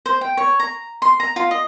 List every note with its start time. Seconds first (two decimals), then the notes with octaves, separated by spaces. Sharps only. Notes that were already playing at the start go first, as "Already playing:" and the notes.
0.06 C5
0.21 G5
0.37 C#5
0.60 A#5
1.02 C6
1.20 A#5
1.36 F4
1.51 D#5